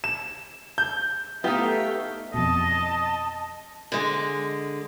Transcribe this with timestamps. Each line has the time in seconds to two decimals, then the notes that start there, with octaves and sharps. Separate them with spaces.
0.04 E7
0.78 G6
1.44 A3 B3 D#4 G4 E5 F5 G5
2.34 F2 B2 D#5 A5
3.92 D3 G#3